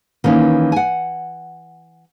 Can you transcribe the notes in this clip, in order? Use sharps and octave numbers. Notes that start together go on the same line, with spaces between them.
D#3 E3 A#3 C#4
F#5 G#5